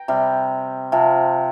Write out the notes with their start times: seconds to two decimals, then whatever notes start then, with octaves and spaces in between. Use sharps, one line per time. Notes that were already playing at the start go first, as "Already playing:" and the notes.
Already playing: G5 A#5
0.08 C3 G3
0.92 C3 F3